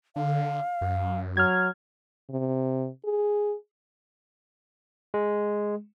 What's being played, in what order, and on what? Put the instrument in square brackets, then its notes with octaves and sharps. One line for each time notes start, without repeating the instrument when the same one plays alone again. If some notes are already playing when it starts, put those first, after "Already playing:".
[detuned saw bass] D3 [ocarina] F5
[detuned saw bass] F#2
[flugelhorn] F#3 [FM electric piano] F6 G#6
[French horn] C3
G#4
[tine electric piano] G#3